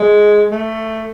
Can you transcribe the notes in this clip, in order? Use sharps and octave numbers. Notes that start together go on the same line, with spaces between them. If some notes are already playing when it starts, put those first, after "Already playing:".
Already playing: G#3
A3